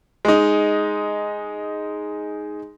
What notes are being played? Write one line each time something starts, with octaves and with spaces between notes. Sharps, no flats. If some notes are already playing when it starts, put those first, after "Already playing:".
G#3 D#4